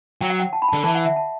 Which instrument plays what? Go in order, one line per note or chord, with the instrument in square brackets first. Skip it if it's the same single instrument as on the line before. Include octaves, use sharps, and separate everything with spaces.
[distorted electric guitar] F#3 [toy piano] G5
[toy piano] F#5
G5
A5
B5
[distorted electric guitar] D3 [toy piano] A5
[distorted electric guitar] E3 [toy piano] A5
[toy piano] F#5
E5
A5